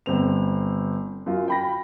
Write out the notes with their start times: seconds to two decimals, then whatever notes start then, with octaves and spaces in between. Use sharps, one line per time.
0.06 G1 C4 F7
1.26 F#2 F4
1.48 G5 B5 A#6